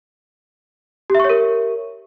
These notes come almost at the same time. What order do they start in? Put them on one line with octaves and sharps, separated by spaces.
G4 E5 C#6 C#5 A#4